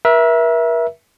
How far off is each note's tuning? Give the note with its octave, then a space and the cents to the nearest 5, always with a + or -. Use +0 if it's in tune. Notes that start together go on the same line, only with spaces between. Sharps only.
A#4 +45 E5 +0